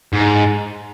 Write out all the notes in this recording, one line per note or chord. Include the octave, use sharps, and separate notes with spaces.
G#2